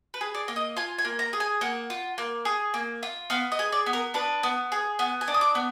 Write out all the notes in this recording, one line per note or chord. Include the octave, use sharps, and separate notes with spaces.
B4
G#4
D5
A#3
D#5
F4 G#5
G#5
A#3
A#5
G#4
G#5
A#3 F#5
F4
A#3
G#4
A#3
F4
B3 F5
D#5
G#4
D5
B3
A#4
D4 B4
B3
G#4
B3 F#5
G#5
D4
D#6
D6
B3